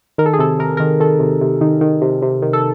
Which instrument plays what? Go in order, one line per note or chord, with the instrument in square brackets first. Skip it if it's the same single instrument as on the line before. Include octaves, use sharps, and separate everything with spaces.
[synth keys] D#3 A#4
A4
G#4
C3 A4
C3 A#4
D#3 A#4
D#3 A4
C3
C3
D#3
D#3
C3
C3
D#3
A4